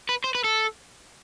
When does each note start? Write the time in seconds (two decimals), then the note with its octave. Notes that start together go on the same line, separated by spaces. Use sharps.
0.09 B4
0.24 C5
0.35 B4
0.44 A4